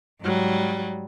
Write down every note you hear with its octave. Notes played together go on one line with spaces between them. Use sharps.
G#2 F#3 G3